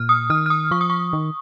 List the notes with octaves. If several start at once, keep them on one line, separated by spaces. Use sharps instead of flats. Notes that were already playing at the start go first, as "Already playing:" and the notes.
Already playing: A#2 F6
D#6
D#3 F6
F6
D#6
F3 C#6
D#6
C#6
D#3